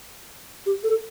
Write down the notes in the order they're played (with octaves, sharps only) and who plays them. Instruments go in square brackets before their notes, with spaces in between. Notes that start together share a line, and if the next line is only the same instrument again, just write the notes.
[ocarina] G4
A4